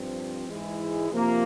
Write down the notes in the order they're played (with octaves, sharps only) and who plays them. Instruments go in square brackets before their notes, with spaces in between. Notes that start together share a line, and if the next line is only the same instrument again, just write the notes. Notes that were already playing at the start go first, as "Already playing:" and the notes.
Already playing: [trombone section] G2 F3 C4
G#2 E3 G#3 E4 G#4
C3 F3 A#3 F4